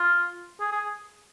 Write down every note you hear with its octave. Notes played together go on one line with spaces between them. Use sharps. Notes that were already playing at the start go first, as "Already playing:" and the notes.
Already playing: F4
G#4
G#4